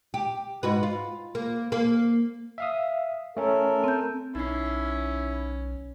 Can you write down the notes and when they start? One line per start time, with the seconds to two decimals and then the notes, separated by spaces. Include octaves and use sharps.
0.14 G4
0.63 G#2 F#4 B4
0.83 F4
1.35 A#3
1.72 A#3
2.58 E5 F5 D#6
3.37 A3 C#4 A4 A#4
3.84 C4 G6
4.35 B1 C#4 D#4 E4 C7